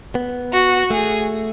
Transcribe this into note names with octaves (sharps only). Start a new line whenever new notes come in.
B3
F#4
A3 G#4